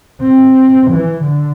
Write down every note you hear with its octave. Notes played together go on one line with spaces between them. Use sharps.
C4
E3
D3